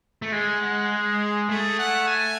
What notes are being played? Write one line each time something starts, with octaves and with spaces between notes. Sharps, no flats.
A3
G#3 G#5
F#5
G#4
A3 G#4
F#5
G#5